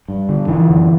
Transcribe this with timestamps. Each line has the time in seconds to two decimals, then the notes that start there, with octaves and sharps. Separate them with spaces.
0.08 G2
0.29 D3
0.48 D3 E3
0.70 F#2